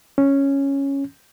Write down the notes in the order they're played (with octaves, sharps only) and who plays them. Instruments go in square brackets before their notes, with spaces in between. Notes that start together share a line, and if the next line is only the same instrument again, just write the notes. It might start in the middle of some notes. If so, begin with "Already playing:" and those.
[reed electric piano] C#4